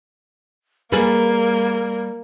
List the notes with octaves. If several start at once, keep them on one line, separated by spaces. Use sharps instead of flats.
G3 A#3 G#4 B4